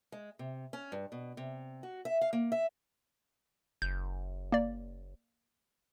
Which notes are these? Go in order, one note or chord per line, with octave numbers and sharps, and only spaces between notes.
G#3
C3
C#4
G2
B2
C3
F#4
E5
F5
A#3
E5
F#1 G6
A#3 D5